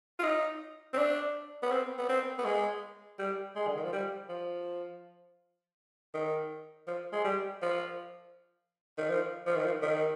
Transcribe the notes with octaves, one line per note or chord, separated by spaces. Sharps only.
F4
D#4
C4
D4
B3
C4
B3
C4
B3
G#3
G3
G#3
D3
D#3
F3
G3
F3
D#3
F3
G#3
G3
F3
D#3
F3
F3
D#3
F3
D#3